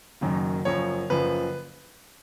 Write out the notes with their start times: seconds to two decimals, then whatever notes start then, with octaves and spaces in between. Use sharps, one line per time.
0.21 F#1 F#2 D#3 F#3
0.65 F#1 F#2 F3 C#5
1.10 F#1 F#2 F3 B4